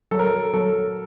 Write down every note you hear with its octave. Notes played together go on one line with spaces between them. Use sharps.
F#3 A4
A#4
A4
F#3 A4